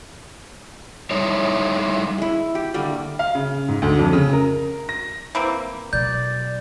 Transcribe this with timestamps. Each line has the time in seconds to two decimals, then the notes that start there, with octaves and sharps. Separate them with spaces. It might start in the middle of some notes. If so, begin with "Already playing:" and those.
1.11 G3 D#4 E4 C#5
2.18 G#3 E4
2.55 G4
2.74 D3 G3 A3 A#3
3.19 F5
3.35 C#3
3.68 G#2
3.82 D2
3.99 F2
4.13 C#3
4.33 A#4
4.89 A#6
5.35 E3 A#3 C4
5.93 B2 F#3 D5 G6